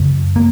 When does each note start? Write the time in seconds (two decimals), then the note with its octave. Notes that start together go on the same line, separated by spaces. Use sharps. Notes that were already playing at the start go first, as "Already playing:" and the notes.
Already playing: F#2 C#3
0.36 A#3